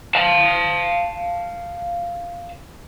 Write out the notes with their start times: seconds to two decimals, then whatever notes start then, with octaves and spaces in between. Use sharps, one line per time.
0.15 F5 A5